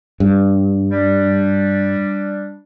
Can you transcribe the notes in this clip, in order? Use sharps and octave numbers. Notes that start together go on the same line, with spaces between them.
G2
G3 D4